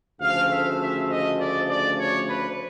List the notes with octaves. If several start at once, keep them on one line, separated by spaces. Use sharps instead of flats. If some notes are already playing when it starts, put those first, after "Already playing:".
D2 C#3 F3 A3 F5
E5
E5
D#5
D5
D5
C#5
B4